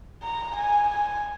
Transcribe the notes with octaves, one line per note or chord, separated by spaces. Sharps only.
A#5
G#5
G#5